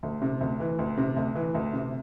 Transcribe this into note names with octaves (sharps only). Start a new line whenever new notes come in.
D2
C3
D2
E3
D2
C3
D2
E3
D2
C3